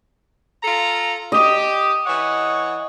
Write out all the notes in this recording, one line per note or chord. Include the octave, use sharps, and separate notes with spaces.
F4 A4 A#5
G4 D#5
E3 C#5 F#5